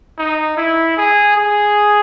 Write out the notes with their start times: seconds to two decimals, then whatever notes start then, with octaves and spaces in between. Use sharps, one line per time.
0.18 D#4
0.57 E4
0.97 G#4
1.37 G#4